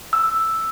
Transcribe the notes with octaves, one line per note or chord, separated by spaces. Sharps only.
E6